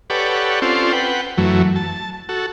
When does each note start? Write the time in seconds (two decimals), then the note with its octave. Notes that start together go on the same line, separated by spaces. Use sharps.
0.10 G4 A4 B4 C#5 D5 F#5
0.62 C4 C#4 F4 A4 C5 D5
0.93 B4 F#5 G5
1.38 F#2 E3 F#3 A3
1.76 A5
2.29 F#4 A4